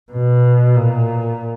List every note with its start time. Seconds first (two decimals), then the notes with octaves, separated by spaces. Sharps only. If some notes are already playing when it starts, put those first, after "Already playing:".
0.12 B2
0.76 A#2